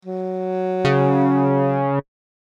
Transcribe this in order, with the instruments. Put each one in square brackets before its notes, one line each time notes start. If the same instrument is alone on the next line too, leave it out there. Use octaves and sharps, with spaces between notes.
[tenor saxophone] F#3
[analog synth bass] C#3